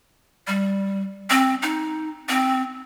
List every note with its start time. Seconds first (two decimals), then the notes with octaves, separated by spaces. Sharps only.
0.47 G3
1.30 C4
1.62 D#4
2.29 C4